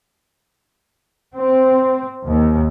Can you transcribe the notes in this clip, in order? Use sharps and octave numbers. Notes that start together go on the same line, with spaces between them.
C4
D#2